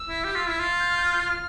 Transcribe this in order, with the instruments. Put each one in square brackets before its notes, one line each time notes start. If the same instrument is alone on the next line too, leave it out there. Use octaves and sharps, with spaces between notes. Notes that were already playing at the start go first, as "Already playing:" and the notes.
Already playing: [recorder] E6
[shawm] E4
G4
F4
E4
F4
[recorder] F6
G6
F6
G6
F6
G6
F6